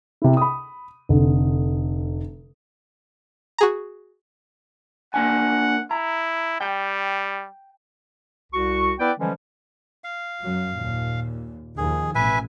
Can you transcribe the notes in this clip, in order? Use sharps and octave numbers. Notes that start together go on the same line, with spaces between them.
C3 E4
B5 D#6
F1 D3
F#4 G#4 A#5
A#3 D4 F#5 G#5
E4 A#5
G3 G5
C2 F#4 C#6
B3 E4 B4 D5 G5
D3 E3 F3 G3 G#3 C#4
F5
F#2 F#3
D#2 A#2
D#2 D#3 F3 G#4
A1 B2 B4 E5 G#5